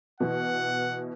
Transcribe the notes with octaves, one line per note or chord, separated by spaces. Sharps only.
B2 E3 F#5